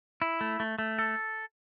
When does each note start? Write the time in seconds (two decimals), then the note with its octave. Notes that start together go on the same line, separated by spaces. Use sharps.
0.22 E4
0.41 A3
0.60 A3
0.79 A3
0.99 A4